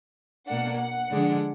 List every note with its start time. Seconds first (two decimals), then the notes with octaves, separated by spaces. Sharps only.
0.48 B2 A#3 D4 F#5
0.80 F#5
1.11 D3 F3 G#3 D4